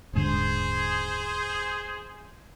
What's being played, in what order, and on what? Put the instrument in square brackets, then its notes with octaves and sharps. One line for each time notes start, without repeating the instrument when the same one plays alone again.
[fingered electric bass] D#1 G#2 D3 [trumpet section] G#4 C5